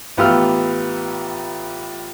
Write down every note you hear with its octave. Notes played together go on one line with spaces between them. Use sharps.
A1 B3 F4 G4 E6 F6